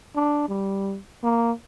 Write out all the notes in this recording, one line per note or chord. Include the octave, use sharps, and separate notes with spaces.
D4
G3
A#3